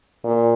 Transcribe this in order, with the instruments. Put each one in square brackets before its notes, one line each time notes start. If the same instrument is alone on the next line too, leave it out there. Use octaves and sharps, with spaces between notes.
[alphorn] A#2